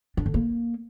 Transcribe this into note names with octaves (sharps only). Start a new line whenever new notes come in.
D4
D3
A#3